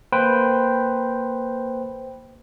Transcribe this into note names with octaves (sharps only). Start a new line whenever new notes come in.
A#3 B4 C5 G5